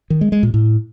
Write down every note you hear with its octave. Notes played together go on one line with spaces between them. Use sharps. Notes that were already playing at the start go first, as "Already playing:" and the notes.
D#3
G#3
G#3
A#2
A2